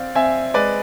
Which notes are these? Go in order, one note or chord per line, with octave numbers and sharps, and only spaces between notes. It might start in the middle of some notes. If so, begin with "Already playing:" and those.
Already playing: C4 D5 F5
C4 E5 G#5
G#3 B4 D5